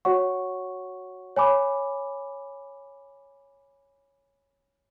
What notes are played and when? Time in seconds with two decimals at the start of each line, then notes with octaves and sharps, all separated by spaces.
0.05 F#4 C#5 F#5 C#6
1.36 C#5 G#5 B5 D6